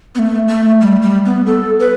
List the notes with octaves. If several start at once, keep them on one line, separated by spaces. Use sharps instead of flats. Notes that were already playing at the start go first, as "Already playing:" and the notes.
B3
A3
A3
G3
G3
B3
A4
B4